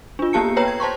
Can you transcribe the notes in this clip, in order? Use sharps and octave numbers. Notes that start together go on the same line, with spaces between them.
D4 F4
A#3 B3 G4 A5 C#7
B4 C#5 G5 A#5
G#6
C5 A5 C6 C#6